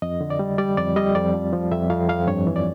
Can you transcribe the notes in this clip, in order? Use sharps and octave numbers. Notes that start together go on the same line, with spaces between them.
F2 D#5
D3
D5
G3
G3 D5
F2 D5
G3 D#5
F2 D5
F3
F3
F2 E5
F2 F5
F2 F5
G2 C#5
E3
D5